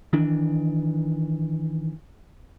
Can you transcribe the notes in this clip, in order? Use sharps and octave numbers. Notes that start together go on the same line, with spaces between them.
D#3 E3 D4